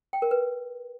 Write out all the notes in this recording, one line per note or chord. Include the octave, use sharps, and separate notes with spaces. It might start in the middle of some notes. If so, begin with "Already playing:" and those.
G5
A#4
B4